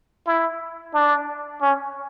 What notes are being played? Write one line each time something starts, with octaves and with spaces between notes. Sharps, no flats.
E4
D4
C#4